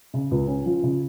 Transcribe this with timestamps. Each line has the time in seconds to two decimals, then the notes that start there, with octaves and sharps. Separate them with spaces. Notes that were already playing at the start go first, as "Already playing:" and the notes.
0.14 C#3
0.31 C#2
0.48 C#4
0.66 F3
0.83 C#3